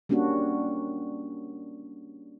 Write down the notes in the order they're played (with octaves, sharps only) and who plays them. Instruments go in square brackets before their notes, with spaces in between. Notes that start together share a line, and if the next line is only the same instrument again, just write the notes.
[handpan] G3 A#3 C#4 D4 F#4